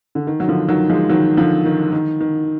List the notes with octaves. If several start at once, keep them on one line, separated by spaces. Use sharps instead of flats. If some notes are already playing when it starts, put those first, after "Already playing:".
D3
D#3
F#3
D3 F3
D#3 F#3
F3 G#3
D#3 F#3
D3 F3
D#3
D#3
D#3